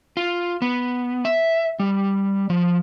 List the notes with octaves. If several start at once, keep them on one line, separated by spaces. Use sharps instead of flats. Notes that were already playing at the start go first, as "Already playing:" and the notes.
F4
B3
E5
G3
F3